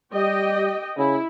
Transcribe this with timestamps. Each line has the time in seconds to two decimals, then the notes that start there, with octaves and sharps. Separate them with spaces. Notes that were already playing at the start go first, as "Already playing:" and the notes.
0.14 G3 G4 D#5 G5
0.98 C#3 E4